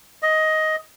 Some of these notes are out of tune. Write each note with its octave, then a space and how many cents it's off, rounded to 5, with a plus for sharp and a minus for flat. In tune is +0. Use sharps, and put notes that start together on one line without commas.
D#5 +10